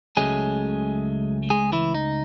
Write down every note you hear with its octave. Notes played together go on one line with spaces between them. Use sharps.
C#2 C#3 F#3 G#3 A3 C#4 G#4
G#3 G#4
E3 E4
D#4